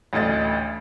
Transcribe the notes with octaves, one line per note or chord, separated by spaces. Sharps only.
A1 D2 D#5 A6